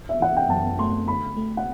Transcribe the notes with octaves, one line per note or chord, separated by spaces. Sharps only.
E5
E3 F#5
G5
F#2 A5
A3 C6
D3 B5
A3
F#5